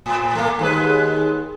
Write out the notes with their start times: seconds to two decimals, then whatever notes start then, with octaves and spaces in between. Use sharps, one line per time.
0.06 A2
0.35 A3 A#3
0.59 D#2 G#3 B4